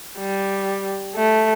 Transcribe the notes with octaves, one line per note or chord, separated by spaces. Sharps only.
G3
A3